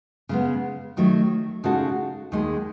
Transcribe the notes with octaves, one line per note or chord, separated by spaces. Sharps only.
C#3 G#3 B3
D#3 F#3 A3
C#3 G#3 D#4 F#4 A4
D#2 D#3 G#3